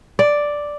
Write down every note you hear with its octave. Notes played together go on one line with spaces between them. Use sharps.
D5